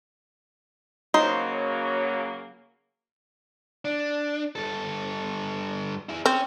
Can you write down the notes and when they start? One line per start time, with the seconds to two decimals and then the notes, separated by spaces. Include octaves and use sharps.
1.14 C#3 F#3 A#3 D#4 C5
3.85 D4
4.56 G2 A4
6.09 E4 G#4
6.26 C4 C#4